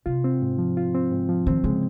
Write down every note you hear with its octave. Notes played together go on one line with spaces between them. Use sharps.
C3 F4
C4
G#2
F3
F4
C4
G#2
F3
D#3 C4
C#3 G#3